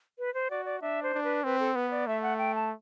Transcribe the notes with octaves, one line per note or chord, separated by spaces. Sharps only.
B4
C5
F#4 D5
D5
D4 E5
C5
D4
B4
C4 B4
A4
B3 B4
D5
A3 E5
F#5
G5
A5